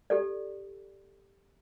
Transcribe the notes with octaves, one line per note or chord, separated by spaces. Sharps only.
G4 A4 D5